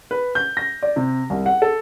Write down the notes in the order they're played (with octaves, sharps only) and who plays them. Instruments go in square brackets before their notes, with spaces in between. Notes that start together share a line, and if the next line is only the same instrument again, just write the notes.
[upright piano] B4
G6
A#6
D5
C3
C2
F#5
A4